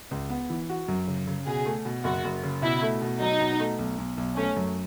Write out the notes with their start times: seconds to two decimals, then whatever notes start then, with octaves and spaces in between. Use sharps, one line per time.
0.11 C#2
0.30 B3
0.50 E3
0.69 F#4
0.88 F#2
1.08 C#3
1.27 C#3
1.46 B2 G#4
1.66 A3
1.85 B2
2.04 F#1 F#4
2.24 F#1
2.43 C#3
2.62 B2 E4
2.82 A3
3.02 B2
3.20 F#3 D#4
3.40 B2
3.60 A3
3.79 B1
3.98 B1
4.17 B1
4.36 A3 C#4
4.56 F#2